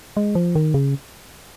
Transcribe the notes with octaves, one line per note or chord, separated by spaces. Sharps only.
G#3
F3
D#3
C#3